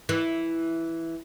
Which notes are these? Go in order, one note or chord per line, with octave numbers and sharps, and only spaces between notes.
E3